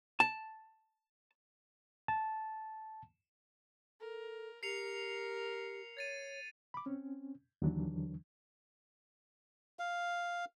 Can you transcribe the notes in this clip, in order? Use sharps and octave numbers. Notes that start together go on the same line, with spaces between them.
A5
A5
A4 A#4
G4 A#4 C7 C#7 F7
C#5 G#6 A6 D#7
B5 D6
C4 C#4
D#2 D3 E3 F#3 D4
F5